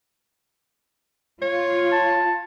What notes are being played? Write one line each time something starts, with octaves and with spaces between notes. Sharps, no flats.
F4 C#5
A5